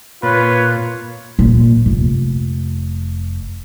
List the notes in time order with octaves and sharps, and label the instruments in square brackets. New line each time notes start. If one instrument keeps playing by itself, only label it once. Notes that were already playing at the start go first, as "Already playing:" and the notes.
[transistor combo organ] A#2 [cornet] F4 [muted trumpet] B4 [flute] C#5
[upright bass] A#2
F1